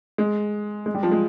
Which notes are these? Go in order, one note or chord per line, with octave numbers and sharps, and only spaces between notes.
G#3
G#3
G3
F3
G#3